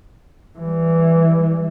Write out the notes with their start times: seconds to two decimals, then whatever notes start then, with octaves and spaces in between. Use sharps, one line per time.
0.58 E3 G3